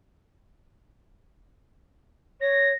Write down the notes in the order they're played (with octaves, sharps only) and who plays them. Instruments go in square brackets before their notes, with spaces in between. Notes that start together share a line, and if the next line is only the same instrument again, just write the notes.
[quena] C#5 [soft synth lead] A#6